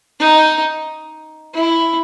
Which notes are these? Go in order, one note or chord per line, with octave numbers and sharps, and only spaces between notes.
D#4
E4